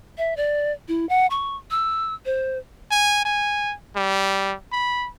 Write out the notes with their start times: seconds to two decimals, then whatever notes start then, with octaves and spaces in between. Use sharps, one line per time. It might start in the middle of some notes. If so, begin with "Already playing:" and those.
0.18 E5
0.37 D5
0.88 E4
1.09 F#5
1.30 C#6
1.71 E6
2.26 C5
2.91 G#5
3.25 G#5
3.96 G3
4.72 B5